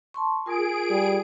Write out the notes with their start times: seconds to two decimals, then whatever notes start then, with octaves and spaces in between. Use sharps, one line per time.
0.14 A5 C6 C#6
0.46 F4 G#4 A#4 D7
0.90 G3